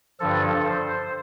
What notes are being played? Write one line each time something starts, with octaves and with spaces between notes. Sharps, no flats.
G2 D3 F3 A4
C5